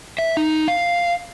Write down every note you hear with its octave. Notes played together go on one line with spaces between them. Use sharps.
E5
D#4
F5